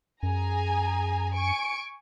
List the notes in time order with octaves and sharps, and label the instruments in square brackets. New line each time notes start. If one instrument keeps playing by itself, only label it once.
[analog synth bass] F#2 [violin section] G#4 G#5 A#5
[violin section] G#5 C#6 D7